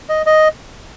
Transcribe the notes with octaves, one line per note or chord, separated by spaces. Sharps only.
D#5
D#5